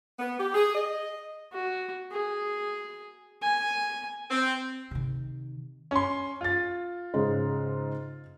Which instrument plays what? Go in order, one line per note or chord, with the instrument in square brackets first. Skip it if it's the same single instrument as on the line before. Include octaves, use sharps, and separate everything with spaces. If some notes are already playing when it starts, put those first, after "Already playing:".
[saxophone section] B3
G4
G#4
D#5
[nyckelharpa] F#4
G#4
G#5
[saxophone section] C4
[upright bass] C3 D#3
[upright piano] C#4 C6
F4 A6
[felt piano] G#2 C#3 G#3